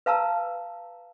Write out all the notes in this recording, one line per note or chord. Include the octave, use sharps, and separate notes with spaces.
B4 F5 A5 A#5 E6